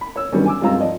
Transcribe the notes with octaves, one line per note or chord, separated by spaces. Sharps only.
B5
C#5 E6
D3 D#3 F#3 G3 B3 C#4
G#5 D6 E6
G2 G#3 C4 F4 A#5 E6
F3 D5 D#5